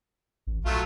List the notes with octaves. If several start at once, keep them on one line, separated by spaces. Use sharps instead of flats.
A1
A#1 F#3 A3 F4